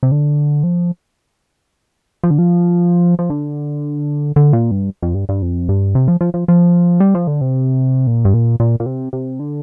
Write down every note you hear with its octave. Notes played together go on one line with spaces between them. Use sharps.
C3
D3
F3
F3
D3
F3
F3
D3
D3
A#2
G2
F2
G2
G2
F2
G2
C3
F3
F3
F3
F3
G3
F3
D3
C3
A#2
G2
A#2
A#2
A#2
C3
C3
D3